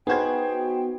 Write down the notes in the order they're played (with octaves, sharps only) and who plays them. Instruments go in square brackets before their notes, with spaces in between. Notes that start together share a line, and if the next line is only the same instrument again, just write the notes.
[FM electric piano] B3 F#4 [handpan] D#4 B4 [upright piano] G#4 C5 G#6 [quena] G5